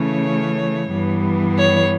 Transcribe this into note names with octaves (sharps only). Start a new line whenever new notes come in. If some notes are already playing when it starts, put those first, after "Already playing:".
Already playing: C#3 E3 A3 C#4 C#5
G2 E3 G3 B3
C#5